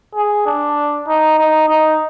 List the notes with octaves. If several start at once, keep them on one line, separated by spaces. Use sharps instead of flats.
G#4
D4
D#4
D#4
D#4